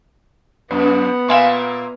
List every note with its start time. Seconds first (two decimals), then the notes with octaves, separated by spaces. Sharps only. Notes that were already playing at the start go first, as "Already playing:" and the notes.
0.71 F#2 B3 B4
1.28 A#2 A#3 E5 F5 G#5 C6